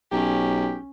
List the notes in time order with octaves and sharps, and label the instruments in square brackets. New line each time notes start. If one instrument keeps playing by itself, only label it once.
[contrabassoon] B1 [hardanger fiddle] C#4 [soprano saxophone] G4